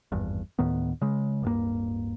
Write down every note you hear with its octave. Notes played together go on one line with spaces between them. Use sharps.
G#1 E2 G2
D2 A2 D#3 B3
C#3 G#3
D1 G2 A#3